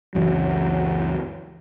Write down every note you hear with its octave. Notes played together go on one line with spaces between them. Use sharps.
C#2 F#2 E3 F#3